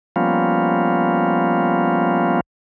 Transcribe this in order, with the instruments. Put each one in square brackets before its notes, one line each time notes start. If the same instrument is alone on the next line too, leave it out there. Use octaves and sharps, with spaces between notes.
[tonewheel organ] F3 G3 A#3 B3 C#4 F4